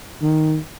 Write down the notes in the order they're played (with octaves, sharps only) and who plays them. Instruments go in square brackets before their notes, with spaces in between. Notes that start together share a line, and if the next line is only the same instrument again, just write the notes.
[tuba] D#3